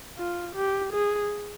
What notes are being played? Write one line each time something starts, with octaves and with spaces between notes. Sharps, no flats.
F4
G4
G#4